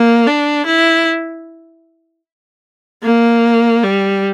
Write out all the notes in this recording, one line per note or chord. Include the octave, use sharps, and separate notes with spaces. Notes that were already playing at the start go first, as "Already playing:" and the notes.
Already playing: A#3
D4
E4
A#3
G3